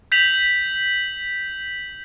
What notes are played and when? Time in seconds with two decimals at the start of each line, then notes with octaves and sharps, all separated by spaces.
0.12 G6 B6 F7 F#7